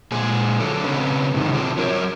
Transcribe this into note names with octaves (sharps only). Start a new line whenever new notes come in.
A#2 G#3 G#4
D3 F#3 A4
C#3 C4 C#4 B4
G#2 C3 D#3
C4 D4 F4 G4 G#4 C5
F#3 A#4 C#5